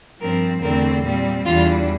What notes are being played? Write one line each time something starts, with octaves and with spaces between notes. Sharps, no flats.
G2 F3 C4 A#4
E2 D3 A3 C4 A#4
A#2 G3 C4
E2 E3 G3 D4 F4